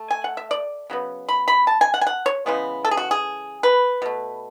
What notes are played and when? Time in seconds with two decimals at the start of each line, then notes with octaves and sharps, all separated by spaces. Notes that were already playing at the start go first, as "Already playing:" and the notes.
Already playing: A3
0.11 G#5
0.24 F#5
0.37 E5
0.51 D5
0.90 C#3 F#3 B3
1.29 B5
1.48 B5
1.67 A5
1.81 G#5
1.94 F#5
2.01 G#5
2.07 F#5
2.26 C#5
2.46 C#3 E3 G#3 B3
2.85 A4
2.91 G#4
2.97 F#4
3.11 G#4
3.63 B4
4.02 B2 A3